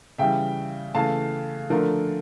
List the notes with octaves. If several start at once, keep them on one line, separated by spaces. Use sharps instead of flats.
C#3 E3 G3 E5 G5
C#3 E3 A3 F5 A5
D3 F3 A3 A#4